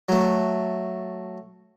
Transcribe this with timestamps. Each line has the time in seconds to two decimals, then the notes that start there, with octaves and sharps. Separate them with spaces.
0.09 F#3 A3